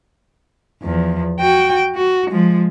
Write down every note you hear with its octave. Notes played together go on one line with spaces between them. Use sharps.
E2 F3
F#4 G5
F#4
F3 G#3